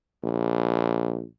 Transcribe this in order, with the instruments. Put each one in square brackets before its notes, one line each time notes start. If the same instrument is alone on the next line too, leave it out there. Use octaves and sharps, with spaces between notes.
[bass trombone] A#1